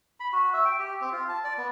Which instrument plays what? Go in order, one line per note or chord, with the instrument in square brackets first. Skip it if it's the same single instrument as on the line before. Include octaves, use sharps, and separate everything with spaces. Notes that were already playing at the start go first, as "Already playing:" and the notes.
[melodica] B5
F#4
E5
G5
G4
C4
F4
A5
D5
B3